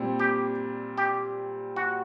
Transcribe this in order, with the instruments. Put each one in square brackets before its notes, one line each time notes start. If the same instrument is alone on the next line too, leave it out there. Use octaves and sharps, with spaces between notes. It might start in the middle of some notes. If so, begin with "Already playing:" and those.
Already playing: [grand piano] A#2 G3 C4
[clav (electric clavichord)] G4
G4
F#4